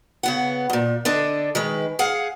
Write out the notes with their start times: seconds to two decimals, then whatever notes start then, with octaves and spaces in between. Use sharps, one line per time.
0.23 C#3 B3 F#5
0.70 E2 A#2
1.05 D3 D4 A4 D#5
1.55 D#3 G#3 B4
1.99 G#4 F5 F#5